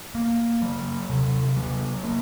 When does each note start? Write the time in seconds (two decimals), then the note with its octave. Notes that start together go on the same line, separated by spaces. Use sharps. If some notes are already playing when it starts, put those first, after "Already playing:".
0.15 A#3
0.62 F#3
1.10 C3
1.56 F#3
2.03 A#3